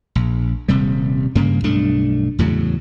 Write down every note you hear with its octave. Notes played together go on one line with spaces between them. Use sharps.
A#1
D#1 C3 G3
G2 C#3 A#3
B1 G2 A3 D4
E2 A2 C#3 F#3